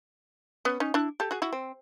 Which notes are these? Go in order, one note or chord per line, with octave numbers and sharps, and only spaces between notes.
B3 C#4
C#4 D#4
D4 E4
G4 A4
F#4 G#4
E4 F#4
C4